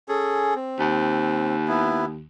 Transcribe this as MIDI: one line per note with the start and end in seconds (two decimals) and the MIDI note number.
0.09 0.54 61
0.09 0.54 68
0.09 0.54 69
0.55 1.56 60
0.79 2.27 39
1.68 2.05 59
1.68 2.05 64